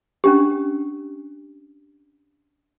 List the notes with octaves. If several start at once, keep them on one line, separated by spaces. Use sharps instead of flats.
C#4 D4 G4